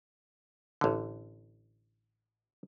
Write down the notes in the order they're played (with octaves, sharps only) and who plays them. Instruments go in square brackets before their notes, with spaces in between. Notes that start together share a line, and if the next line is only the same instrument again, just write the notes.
[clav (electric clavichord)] A1 D3